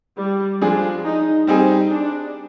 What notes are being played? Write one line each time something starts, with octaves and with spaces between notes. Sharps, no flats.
G3
F3 G#3 D4 G#4
D#4
G3 C4 D#4 G#4
D4